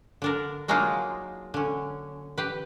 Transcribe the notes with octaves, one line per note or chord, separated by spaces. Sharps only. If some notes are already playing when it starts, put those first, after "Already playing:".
D3 D4 A#4
F#3 G#3 A#3 D4 D#4 F4
D3 C#4
G4 B4